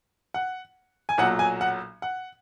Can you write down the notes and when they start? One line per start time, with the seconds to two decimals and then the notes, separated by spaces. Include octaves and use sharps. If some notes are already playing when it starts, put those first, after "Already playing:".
0.34 F#5
1.09 G#5
1.18 B1 A#2 F#3 F#5
1.39 G#5
1.61 F#5
2.02 F#5